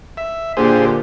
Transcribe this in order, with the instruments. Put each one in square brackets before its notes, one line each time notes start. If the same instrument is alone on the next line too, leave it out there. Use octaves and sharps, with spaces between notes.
[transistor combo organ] E5
[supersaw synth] A#2 D3 G4 [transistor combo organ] G#4 C5